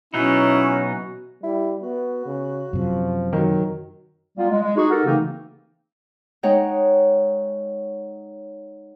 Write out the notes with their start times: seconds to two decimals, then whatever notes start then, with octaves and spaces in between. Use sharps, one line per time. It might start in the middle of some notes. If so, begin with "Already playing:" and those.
0.14 B2 E3 F#3 B3 C#4 D#4 E4 F#4
1.44 G3 E4
1.83 B3 F#4
2.26 C#3
2.73 F#2 C3 F3
3.33 D#3 F#3
4.37 G3 A#3 B3 F4
4.50 G#3
4.62 G#3
4.76 D#4 F#4 G#4
4.89 D#4 F#4 G4 A4 A#4
5.05 C#3 E3 A3 A#3 C4 D#4
6.43 G#3 D#4 C#5 F#5 G5